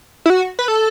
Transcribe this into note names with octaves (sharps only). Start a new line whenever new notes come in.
E4
F#4
B4
A4